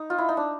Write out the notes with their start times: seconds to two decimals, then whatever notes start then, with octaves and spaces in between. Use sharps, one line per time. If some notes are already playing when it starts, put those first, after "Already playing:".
Already playing: D#4
0.10 F4
0.18 E4
0.29 D#4
0.37 D4